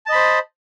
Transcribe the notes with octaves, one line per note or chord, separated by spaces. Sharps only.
C5 D#5 A5 B5